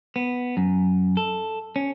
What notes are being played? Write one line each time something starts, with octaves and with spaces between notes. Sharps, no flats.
B3
F#2
A4
C#4